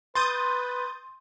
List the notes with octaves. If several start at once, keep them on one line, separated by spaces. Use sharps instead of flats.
B4 C6 D#6 G6 A6